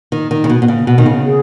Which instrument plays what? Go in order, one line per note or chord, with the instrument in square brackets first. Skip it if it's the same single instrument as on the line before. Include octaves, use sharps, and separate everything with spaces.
[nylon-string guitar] D#3
D#3
C#3
B2
B2
C#3
B2
D#3
C#3
[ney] G#4